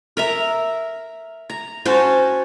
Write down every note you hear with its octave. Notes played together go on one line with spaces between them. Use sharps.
A#4 E5 A#5
A#5
C#4 F#4 C5 A5